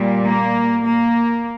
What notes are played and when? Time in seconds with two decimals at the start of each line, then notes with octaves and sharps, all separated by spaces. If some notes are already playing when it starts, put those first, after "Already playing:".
Already playing: A#2 G3
0.26 A#3
0.85 A#3